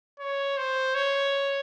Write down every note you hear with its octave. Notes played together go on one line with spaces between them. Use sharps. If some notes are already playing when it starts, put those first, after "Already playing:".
C#5
C5
C#5